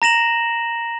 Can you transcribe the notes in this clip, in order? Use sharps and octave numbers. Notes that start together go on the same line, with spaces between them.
A#5 A#6 E7 F#7